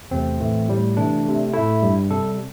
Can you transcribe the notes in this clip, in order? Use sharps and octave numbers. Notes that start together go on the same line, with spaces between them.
E2 C3 A3 C4
A2 E3 A3
A2 G3
C3 E3 A3 D4
C3 A3
A2 A3 E4
G2 G3
C3 G3 A4